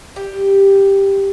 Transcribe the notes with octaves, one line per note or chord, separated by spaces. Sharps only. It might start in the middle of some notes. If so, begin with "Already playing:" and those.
G4